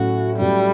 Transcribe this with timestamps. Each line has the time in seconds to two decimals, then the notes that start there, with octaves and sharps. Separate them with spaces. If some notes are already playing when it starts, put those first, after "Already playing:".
Already playing: A2 F#3 C#4 F#4
0.37 A2 F#3 G3 C#4